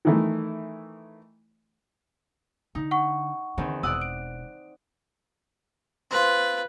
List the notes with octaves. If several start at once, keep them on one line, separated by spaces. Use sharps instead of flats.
D#3 E3 A3
D3 D#4
F#5 C#6
E2 D3 D#3 C4
E1 D5 F#5 D#6 E6
D7
C4 F4 B4